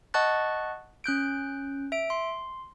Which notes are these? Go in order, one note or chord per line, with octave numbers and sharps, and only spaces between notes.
D#5 F#5 A5 C#6 F#6 A6
C#4 F#6 G6 D7
E5 D7
C6